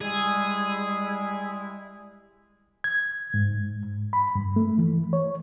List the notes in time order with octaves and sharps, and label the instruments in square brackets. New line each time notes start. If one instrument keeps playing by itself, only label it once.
[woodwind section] G3 G#3 E4 [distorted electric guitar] G#4
[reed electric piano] G#6
G#2
B5
G2
A3
E3
C#5